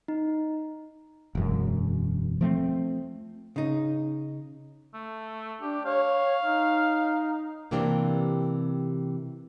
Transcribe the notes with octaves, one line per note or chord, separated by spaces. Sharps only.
D#4
E1 F#2
F3 A3 C4
C#3 D#4
A3
D4 G4
C#5 F5
D#4
C3 E3 A#3 C4 D4 G4